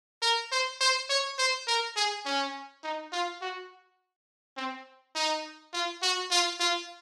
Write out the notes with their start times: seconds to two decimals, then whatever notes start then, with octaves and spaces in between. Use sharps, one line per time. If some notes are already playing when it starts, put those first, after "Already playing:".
0.22 A#4
0.52 C5
0.81 C5
1.10 C#5
1.38 C5
1.67 A#4
1.96 G#4
2.25 C#4
2.83 D#4
3.12 F4
3.41 F#4
4.57 C4
5.15 D#4
5.73 F4
6.02 F#4
6.31 F4
6.60 F4